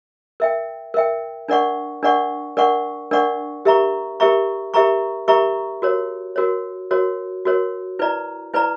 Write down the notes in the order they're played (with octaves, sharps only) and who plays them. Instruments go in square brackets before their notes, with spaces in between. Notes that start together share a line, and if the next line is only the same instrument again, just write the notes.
[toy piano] A#4 E5 G5
A#4 E5 G5
D4 A#4 D5 F#5 C#6
D4 A#4 D5 F#5 C#6
D4 A#4 D5 F#5 C#6
D4 A#4 D5 F#5 C#6
G4 A#4 E5 A#5 C#6
G4 A#4 E5 A#5 C#6
G4 A#4 E5 A#5 C#6
G4 A#4 E5 A#5 C#6
F#4 A#4 C#5
F#4 A#4 C#5
F#4 A#4 C#5
F#4 A#4 C#5
E4 B4 D5 A#5
E4 B4 D5 A#5